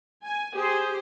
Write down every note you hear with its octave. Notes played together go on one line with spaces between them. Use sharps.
G#5
G4 G#4 C5